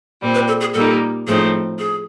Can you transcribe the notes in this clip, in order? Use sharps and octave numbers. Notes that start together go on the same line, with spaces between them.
A#2 G3 C4
B4
A4
G#4
A#2 G3 A#3 D#4 A4
A2 F3 A3 C4 D#4 G#4
G#4